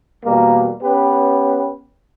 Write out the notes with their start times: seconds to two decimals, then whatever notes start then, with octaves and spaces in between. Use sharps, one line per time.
0.25 E2 B2 G3 A#3
0.82 B3 C#4 G4 B4